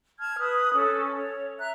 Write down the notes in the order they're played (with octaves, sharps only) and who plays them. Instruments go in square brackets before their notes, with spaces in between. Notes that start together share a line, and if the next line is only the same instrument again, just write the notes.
[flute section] A5 F6 G#6
B4 D#6
C#4 A4
C#5
E5 A#5 F#6